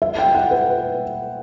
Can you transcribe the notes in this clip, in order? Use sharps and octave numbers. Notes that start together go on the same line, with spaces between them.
E5
G5
F#5
B4